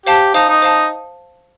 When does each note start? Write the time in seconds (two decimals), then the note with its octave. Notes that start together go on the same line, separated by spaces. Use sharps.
0.06 G4 C5 F5 A5
0.34 D#4 C5 F5 A5
0.49 D#4
0.62 C5 F5 A5